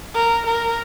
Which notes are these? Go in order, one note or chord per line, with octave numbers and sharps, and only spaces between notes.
A#4
A#4